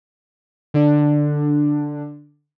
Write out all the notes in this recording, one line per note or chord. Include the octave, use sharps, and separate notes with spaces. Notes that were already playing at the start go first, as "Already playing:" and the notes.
D3 D4